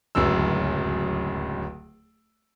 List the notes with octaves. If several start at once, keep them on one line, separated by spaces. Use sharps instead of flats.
D1 C#2 F#2 E6